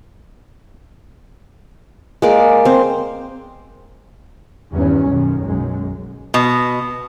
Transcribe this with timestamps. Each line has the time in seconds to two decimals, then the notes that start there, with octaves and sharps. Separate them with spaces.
2.22 G#3 A#3 D5
2.65 C4 C5
4.72 E2 G2 D#3 C#4
5.07 B1 F#2 D#3
5.40 B1 F#2 G#3
6.34 B2